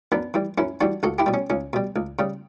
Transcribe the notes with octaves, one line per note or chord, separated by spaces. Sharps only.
F#2 B3 D4
E3 G3
F#2 C#4 E4
E3 G3 D4 F#4
C#2 F#4 A4
E4 G4
B2 G3
C#4
C#2 C#4
B2 G3
C#2
C#3 G3